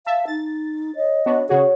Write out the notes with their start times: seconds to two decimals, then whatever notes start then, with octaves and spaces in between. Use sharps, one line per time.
0.06 E5 F5 A5
0.28 D#4 A6
0.96 C#5 D#5
1.26 B3 D4 F#4 C#5
1.49 C#3 F#4 G#4 C#5 F#5